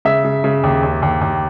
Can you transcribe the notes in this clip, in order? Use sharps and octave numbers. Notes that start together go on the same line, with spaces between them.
C#3 E5
C#3
C#3
D#2
D#2
D#2
D#2